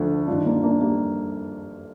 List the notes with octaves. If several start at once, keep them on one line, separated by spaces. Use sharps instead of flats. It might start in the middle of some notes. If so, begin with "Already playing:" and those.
Already playing: D2 D3 F3 D4
G2 D#3 D4 F4
A#3 D4
A#3 D4
G3 A#3